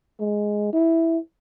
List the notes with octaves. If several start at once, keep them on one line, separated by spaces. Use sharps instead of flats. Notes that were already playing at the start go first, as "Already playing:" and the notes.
G#3
E4